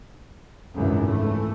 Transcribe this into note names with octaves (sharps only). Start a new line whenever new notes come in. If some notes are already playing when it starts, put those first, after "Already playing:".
G#1 C#2 F#2 B2 E3
E3 A3